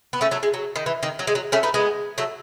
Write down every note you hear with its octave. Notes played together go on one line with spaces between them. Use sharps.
B3
A3 C#4
F#3 A3
G#3
F#3
D#3
E3
D#3
F#3
G#3
F#3
A3 C#4
B3 D#4
G#3 B3
F#3 A3